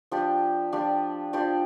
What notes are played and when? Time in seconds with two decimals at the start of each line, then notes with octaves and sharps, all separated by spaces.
0.12 F3 D4 G4 D5
0.72 F3 D4 G4 D5
1.33 F3 D4 G4 D5